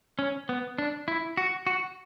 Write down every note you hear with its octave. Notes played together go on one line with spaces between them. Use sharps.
C#4
B3
D4
E4
F#4
F#4